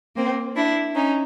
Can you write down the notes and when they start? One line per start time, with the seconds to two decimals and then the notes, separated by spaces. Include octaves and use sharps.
0.16 A#3 C4
0.55 D4 E4
0.95 C#4 D#4